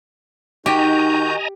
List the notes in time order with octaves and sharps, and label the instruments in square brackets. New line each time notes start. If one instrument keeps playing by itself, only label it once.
[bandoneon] D#3 F#4 G6 [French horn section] D#4 [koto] G4 [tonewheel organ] D#5 G#5 A#5